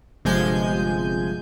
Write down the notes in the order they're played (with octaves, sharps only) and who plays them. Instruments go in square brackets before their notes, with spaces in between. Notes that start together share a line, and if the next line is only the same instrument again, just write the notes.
[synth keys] G1 C3 F3 G#3 G#5 G6